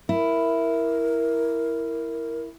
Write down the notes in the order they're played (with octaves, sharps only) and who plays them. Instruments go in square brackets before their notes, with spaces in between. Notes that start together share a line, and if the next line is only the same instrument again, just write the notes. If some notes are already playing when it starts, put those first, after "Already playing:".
[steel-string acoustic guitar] E4 [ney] A#4